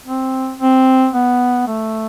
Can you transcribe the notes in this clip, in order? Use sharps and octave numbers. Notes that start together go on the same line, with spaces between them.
C4
C4
B3
A3